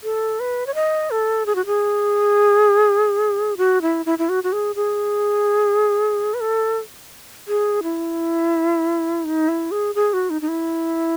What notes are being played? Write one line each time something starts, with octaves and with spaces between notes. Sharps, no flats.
A4
B4
C#5
D#5
A4
G#4
F#4
G#4
F#4
E4
E4
E4
F#4
F#4
G#4
G#4
B4
A4
G#4
E4
D#4
E4
G#4
G#4
F#4
D#4
D#4
E4